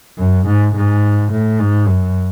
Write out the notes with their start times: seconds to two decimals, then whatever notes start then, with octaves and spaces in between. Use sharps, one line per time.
0.18 F#2
0.47 G#2
0.75 G#2
1.31 A2
1.59 G#2
1.87 F#2